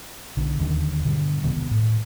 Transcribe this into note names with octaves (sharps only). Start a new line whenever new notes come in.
B1 D3
E1 D#2 D3 D#3
G2 B2 D3
E1 C2 B2 D#3
A2